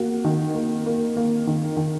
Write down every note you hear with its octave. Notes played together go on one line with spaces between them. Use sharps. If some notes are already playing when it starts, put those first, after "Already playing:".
Already playing: A#3 F#4
D#3
A#3
A#3
A#3
D#3
D#3